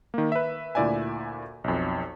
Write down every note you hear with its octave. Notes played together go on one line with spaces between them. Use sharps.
D#3 A#3
B4 E5
D2 A#2 E4 D5 E5 G#5
B1 F2